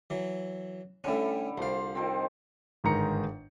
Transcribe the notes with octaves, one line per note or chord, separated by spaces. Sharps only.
E3 F#3
D3 G3 A3 C#4 E4
C2 F3 C5 F5
D#3 F3 C4
G1 G#2 D#3 A#5 C#7